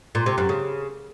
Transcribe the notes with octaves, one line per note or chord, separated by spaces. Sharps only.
A#2
C3
F#2
C#3